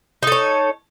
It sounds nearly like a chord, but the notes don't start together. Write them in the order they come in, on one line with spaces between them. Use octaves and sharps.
D#4 A4 C#5